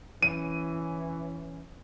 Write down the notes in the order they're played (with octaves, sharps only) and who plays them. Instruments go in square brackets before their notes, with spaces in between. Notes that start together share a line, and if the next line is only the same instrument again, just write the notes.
[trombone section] E3 C#4 [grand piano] D#7